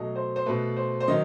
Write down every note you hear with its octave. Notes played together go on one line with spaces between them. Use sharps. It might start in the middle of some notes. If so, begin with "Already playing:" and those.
Already playing: B2 F#3 A3 D#5
C5
C5
B2 A3 B4
C5
C5
D#3 F#3 D#5